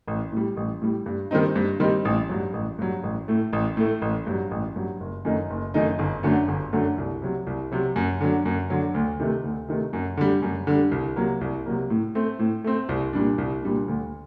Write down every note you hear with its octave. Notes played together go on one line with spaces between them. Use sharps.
A1
A2 G3
A1
A2 G3
G2
D#3 G3 C4 D#4
G2
D#3 G3 C4 D#4
A1
G2 F#3
A1
G2 F#3
A1
A2 A3
A1
A2 A3
A1
G2 F#3
A1
G2 F#3
F#1
F#2 D#3 A3 D#4
F#1
F#2 D#3 A3 D#4
G1
F#2 D3 F#3 A3
G1
F#2 D3 F#3 A3
C2
C3 F#3
C2
C3 F#3
F#2
D3 F#3
F#2
D3 F#3
D2
C3 D#3 A3
D2
C3 D#3 A3
F#2
D3 G3
F#2
D3 G3
C2
C3 F#3 A#3
C2
C3 F#3 A#3
A2
A3 C4
A2
A3 C4
C2
A#2 G3 D4
C2
A#2 G3 D4
D2